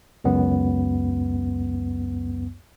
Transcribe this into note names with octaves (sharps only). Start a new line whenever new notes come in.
C#2 F#2 B3